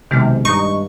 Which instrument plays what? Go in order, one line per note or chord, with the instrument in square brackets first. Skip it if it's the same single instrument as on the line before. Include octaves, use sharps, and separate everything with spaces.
[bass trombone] B1 [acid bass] C3 [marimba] D#3 G#3 F6
[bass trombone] G2 [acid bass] D#4 [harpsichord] C#6